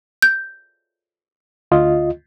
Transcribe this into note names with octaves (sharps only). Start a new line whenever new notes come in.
G6
D2 F4 D#5